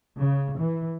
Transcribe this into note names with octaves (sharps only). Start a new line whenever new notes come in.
C#3
E3